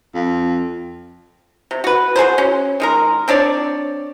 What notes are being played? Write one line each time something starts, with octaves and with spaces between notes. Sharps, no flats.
F2
C3
F#4 B4
F#4 G#4 A#4 C5
C#4
D#3 G#3 A#4
C4 D4 C#5 D5